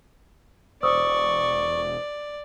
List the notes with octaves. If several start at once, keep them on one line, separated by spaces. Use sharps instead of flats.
E1 C5 D5 C#6 D#6 E6